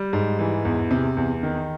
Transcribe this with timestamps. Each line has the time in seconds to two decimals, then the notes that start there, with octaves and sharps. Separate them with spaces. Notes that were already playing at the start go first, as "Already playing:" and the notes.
Already playing: G3
0.13 G#2
0.39 E3
0.65 E2
0.91 C3
1.17 E2
1.43 D#3